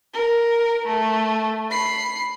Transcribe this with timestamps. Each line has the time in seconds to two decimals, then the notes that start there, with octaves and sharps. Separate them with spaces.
0.14 A#4
0.87 A3
1.71 B5 C7